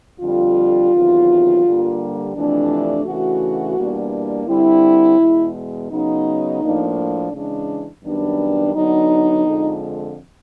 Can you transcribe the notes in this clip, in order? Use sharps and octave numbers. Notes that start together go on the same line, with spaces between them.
F2 D3 G3 F4
E2 C3 D#3 F#3
G2 D3 G3 A#3
F2 C3 E3 A3 D4
C#3 E3 A3 D4 F#4
E2 B2 G3 A#3 D4
D3 G3 C4 E4
E2 B2 G#3
C#3 F#3 B3 D#4
A2 F3 A#3 D4
C#3 E3 G#3 D4
F#2 D#3 G3 B3 D4
D3 F#3 B3 D4 D#4
F2 D3 F3 G#3